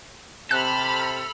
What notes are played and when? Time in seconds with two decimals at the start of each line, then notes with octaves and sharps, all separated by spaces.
0.51 C3 A4 B5 F6 F#6